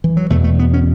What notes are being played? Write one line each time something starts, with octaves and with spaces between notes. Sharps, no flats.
E3
F#3
E2 B2 A3
A3
B3
C#4